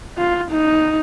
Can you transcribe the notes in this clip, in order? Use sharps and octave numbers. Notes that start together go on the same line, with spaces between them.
F4
D#4